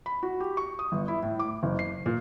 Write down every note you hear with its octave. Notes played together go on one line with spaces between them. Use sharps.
B5
F#4
G4
C#6
D#6
G1
E4
A2
D6
F#1
C7
A#2